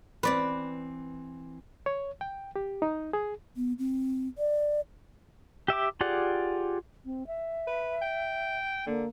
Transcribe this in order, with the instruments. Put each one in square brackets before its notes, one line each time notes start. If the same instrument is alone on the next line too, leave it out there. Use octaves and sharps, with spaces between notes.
[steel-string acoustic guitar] E3 C4 [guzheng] B4 D5
[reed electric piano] C#5
G5
G4
D#4
G#4
[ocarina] B3
C4
D5
[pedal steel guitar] G4 E5 G5 D6
F4 G4 G#4 D5 F#5
[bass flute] C4
E5
[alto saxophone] B4
G5
[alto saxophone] D3 [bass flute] A#3